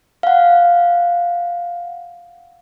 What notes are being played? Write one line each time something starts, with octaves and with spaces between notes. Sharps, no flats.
F5 F#5